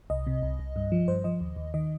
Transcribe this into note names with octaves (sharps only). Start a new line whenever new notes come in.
C2 D#5
C3
C2
C2
G2
F3
G2 C5
F3 D#5
D#2
D#2
D#3 D#5